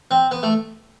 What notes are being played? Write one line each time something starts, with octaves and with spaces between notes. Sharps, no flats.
C4
B3
A3